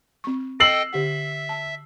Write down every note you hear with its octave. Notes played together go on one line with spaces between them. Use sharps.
C4 C#6
A4 D#5 G5 E6 C7 F#7
D3 G4 E5 F#5
A5